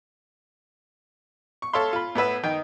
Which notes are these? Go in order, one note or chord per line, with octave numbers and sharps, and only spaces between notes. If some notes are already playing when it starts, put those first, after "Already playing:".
C#6
A4 C#5 E5 F5 C6
F4 B5
A2 B3 B4 E5
D#3 D#4 G5